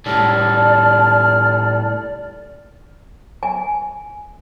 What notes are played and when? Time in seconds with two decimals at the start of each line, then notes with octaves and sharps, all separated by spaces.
0.06 A2 G3 D5 A5 F6
3.43 G#5